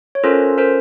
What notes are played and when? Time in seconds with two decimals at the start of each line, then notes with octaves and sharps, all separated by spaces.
0.15 C#5
0.24 C#4 F4 A4 A#4 C5
0.58 A#4 C5